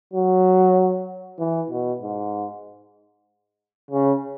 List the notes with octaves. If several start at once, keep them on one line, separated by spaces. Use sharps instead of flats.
F#3
E3
B2
G#2
C#3